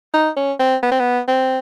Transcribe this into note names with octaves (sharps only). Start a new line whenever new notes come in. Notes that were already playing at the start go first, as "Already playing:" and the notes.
D#4
C#4
C4
B3
C4
B3
C4